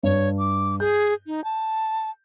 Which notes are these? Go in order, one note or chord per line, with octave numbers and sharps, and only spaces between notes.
G2 C#5
D6
G#4 G6
D#4
A5